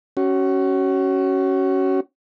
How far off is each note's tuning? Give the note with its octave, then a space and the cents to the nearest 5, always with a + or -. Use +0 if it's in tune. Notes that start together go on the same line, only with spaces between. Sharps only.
C#4 +0 F#4 +30